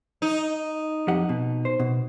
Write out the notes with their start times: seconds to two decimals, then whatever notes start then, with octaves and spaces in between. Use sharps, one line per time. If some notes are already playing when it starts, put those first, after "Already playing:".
0.22 D#4
1.08 F2 G4 F#5
1.29 B2
1.65 C5
1.79 B2